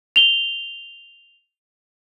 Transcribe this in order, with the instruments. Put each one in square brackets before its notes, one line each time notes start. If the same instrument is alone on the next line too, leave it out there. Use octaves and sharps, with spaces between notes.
[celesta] F7 G7